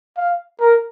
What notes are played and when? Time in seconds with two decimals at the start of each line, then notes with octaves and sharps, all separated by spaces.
0.17 F5
0.60 A#4